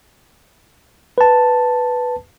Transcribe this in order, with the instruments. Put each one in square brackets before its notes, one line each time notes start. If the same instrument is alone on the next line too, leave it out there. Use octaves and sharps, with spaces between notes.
[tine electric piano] B4 A5